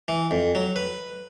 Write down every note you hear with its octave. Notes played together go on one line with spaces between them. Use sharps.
E3
F2
F#3
B4